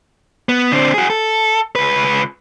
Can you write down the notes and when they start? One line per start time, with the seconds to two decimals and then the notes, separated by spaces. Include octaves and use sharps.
0.49 B3
0.72 D3 C4
0.94 F#4 G#4
1.10 A4
1.75 C#2 B4